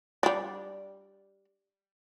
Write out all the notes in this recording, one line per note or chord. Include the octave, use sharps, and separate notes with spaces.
G3 D4